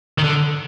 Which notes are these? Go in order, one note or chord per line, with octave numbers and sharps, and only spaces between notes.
D#3
D3